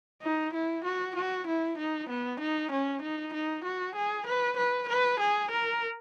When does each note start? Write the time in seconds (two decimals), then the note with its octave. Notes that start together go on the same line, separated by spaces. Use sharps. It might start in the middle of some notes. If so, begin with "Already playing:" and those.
0.22 D#4
0.54 E4
0.85 F#4
1.16 F#4
1.47 E4
1.78 D#4
2.09 B3
2.40 D#4
2.71 C#4
3.02 D#4
3.34 D#4
3.64 F#4
3.96 G#4
4.27 B4
4.57 B4
4.89 B4
5.20 G#4
5.51 A#4